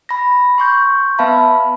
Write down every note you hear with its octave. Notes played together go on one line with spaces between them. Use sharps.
B5 A#6
C6 C#6 G6
B3 B4 E5 F5 A5 B5